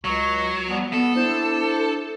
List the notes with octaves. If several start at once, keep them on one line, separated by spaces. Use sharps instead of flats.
C#2 F#3 C#6
F3 G3 B3
B3 A4
D4 E4 C5